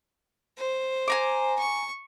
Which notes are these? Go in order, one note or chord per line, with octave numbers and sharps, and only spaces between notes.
C5
G#5 A#5 D6
C#6